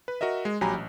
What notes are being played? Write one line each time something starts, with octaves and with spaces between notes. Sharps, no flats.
B4
F#4 A#4 D#5 E5
G#3
A#1 F#3 G4 G#5 A#5 B5
A1